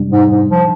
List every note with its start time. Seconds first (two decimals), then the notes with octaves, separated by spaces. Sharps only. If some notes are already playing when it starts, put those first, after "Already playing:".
Already playing: F2 C3 G3 D4
0.12 G#2
0.31 G#2
0.50 F3